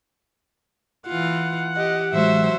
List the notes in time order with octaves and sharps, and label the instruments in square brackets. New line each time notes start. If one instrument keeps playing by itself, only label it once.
[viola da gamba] E3 F4 [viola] F#5
[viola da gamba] G4 [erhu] D#5
[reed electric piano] A2 E3 G#3 [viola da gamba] F#3 C5 [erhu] E5